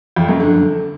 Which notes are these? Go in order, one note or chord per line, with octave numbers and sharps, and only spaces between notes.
F2
F#2
D3